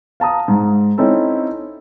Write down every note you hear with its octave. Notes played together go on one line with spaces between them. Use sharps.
F5 A5 A#5 D#6
G#2
C4 C#4 D#4 E4 A4